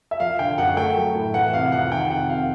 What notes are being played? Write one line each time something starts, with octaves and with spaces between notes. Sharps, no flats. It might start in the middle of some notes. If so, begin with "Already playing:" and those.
E5
F3 F5
D3 G5
F#2 F#5
A3 G5
F#3
A2
E3 F#5
C3 F5
F2 F#5
D#3 G5
C3 F#5
F2 F5